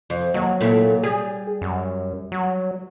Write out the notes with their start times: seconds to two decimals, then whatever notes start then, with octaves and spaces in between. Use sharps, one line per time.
0.10 F2
0.34 D#2 F#3
0.61 A#2 A3 E4
1.04 G3 G#4
1.61 F#2
2.32 F#3